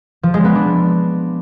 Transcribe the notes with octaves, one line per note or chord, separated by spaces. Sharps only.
F3
G#3
B3
D4